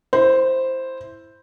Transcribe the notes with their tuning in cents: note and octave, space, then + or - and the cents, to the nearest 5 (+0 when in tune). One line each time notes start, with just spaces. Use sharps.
E4 +0 C5 +0